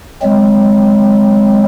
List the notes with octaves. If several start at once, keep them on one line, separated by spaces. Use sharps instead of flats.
F#3 G#3 C4